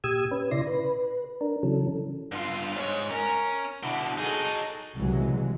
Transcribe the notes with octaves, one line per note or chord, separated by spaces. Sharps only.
A#2 G4 D#6 E6 G#6
C#4 B4
A#2 C#3 E4 D5 C6 A#6
B4
D4 A#4
C#3 E3 F#3 C#4 A4
G2 F4
G#2 C#5
C#4 A#4
B2 D3 E4
F#3 D#4 G#4 A4
C2 A#2 C#3 E3 F#3 G#3